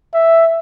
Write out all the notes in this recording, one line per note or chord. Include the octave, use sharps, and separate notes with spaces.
E5